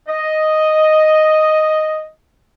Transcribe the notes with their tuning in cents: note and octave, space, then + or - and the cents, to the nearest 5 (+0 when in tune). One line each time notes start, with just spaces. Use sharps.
D#5 +0